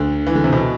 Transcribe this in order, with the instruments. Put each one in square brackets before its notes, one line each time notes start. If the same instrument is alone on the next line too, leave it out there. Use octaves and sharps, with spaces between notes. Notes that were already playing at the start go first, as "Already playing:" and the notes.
Already playing: [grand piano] D2 D3
E3
D3
C3
B2